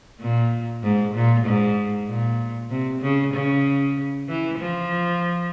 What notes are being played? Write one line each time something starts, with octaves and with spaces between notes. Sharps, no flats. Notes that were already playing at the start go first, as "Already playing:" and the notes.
A#2
G#2
A#2
G#2
A#2
C3
C#3
C#3
E3
F3